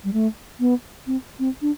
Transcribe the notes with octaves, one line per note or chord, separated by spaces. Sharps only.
G3
A3
B3
C4
C4
D4